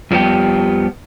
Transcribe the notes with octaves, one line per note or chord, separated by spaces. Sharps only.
F2 F3 G3 B3 G4